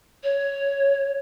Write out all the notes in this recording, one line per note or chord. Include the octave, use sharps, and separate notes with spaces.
C#5